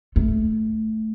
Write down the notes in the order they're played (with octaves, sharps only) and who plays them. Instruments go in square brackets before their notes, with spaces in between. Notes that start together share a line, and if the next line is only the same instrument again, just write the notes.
[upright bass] A3